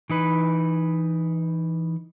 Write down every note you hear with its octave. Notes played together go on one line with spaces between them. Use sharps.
E3 D#4 B4